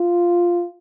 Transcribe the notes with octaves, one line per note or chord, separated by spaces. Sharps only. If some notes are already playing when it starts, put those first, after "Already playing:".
Already playing: F4